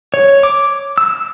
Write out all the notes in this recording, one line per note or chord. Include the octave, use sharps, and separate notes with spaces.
C#5
D6
E6